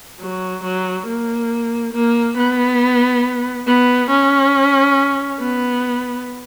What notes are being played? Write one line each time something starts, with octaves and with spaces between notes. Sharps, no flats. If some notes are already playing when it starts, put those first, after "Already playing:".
F#3
F#3
A#3
A#3
B3
B3
C#4
B3